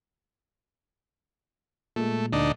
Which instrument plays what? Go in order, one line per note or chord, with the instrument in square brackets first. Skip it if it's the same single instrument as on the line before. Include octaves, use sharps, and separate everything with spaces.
[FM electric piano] A#2 G#3 [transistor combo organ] A3
[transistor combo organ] D2 D4 D#4